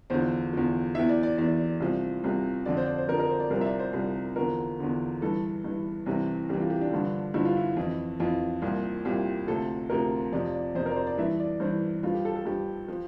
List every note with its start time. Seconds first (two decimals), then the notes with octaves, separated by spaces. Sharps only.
0.10 E2 D3 F3 C5
0.53 E2 D3 F3
0.95 E2 E3 E5
1.09 D5
1.23 D5
1.38 E2 E3 D5
1.80 C2 C3 F3
2.24 C2 C3 F3
2.66 F2 D3 F3 D5
2.77 C5
2.87 D5
2.98 C5
3.08 F2 D3 F3 A#4
3.20 A#4
3.30 C5
3.40 D5
3.50 C2 C3 F3 A#4
3.61 E5
3.65 D5
3.79 C5
3.93 C2 C3 F3
4.36 E2 D3 F3 A#4
4.79 E2 D3 F3
5.21 G2 E3 A4
5.64 G2 E3
6.06 C2 C3 E3
6.49 C2 C3 E3 G4
6.60 F4
6.70 G4
6.81 D4
6.91 G2 D3 F3
7.34 G2 D3 F3 E4
7.45 F4
7.57 E4
7.77 F2 E3
8.20 F2 E3 F4
8.62 C2 A#2 F3
9.05 C2 A#2 F3 G4
9.47 D2 C3 F3 A4
9.90 D2 C3 F3 A#4
10.32 F2 C3 F3 D5
10.54 D5
10.75 F2 C3 F3 C5
10.86 A#4
10.91 D5
10.96 C5
11.07 D5
11.18 G2 E3 E5
11.40 D5
11.60 G2 E3 C5
12.03 G2 F3 F4
12.14 G4
12.25 A4
12.36 A4
12.45 G2 F3 G4
12.88 F3